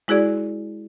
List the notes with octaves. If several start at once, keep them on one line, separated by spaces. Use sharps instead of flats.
G#3 E4 F#4 G#4 D5